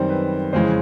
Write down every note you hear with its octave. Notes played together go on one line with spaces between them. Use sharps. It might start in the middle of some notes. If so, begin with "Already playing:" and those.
Already playing: F#2 D#3 G3 C4 C5
B4
F2 C#3 E3 G#3 C5